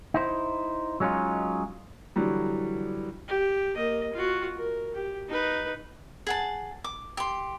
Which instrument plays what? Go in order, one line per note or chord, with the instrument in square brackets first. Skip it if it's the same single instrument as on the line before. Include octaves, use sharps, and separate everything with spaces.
[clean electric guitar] D#4 E4 C5
F#3 G#3 C#4 D#4 F4
[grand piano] D3 E3 F#3 G3
[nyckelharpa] G4
A#3 D#5
F4 F#4
A#4
G4
D#4 B4
[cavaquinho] G#4 F#5 A5
D6
G4 C6